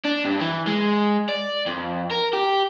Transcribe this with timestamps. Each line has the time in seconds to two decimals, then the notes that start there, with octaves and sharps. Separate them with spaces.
0.05 D4
0.25 G2
0.41 E3
0.67 G#3
1.29 D5
1.67 F2
2.11 A#4
2.33 G4